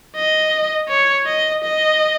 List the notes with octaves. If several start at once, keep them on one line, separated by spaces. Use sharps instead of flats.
D#5
C#5
D#5
D#5